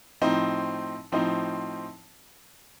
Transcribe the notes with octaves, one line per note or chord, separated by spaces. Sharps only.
A2 F3 C4 D#4
A2 F3 C4 D#4